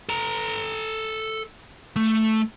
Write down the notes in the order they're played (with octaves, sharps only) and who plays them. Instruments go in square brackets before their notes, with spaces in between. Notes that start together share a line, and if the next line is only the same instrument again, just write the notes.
[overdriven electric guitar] A4 A#5
A3